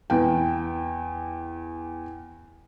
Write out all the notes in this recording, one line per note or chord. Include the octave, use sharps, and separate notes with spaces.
E2 G5